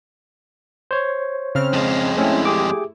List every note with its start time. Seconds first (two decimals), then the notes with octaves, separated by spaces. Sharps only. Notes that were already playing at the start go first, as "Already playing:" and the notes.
0.91 C5 C#5
1.55 C#3 C4 F6
1.73 F2 G#3
2.17 A3 C4 C#4 E4
2.45 G4 G#4 D6